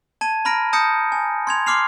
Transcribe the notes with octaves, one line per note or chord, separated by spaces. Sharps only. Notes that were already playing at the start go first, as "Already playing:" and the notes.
A5 G#6 D#7
A#5 B5 F6 A#6 D7
A5 D#6 G6 A#6 C#7
G#5
C6 G#6 F7
C6 D6 F6 C7 F7